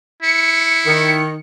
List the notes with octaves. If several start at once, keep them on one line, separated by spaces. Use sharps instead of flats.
E4 C#7
D#3